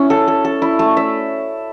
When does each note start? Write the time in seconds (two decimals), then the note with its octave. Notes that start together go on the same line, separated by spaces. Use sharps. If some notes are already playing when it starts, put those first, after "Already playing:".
Already playing: C#4 E4
0.10 A4
0.28 A4
0.45 A4
0.62 E4
0.79 A3
0.97 E5